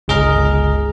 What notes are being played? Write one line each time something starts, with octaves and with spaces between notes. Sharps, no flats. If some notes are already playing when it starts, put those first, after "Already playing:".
G1 C#2 G#4 D#5 A#5 F6